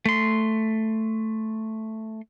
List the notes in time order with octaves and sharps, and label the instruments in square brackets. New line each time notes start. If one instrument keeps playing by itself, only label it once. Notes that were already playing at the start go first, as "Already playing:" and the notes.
[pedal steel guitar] A3 C6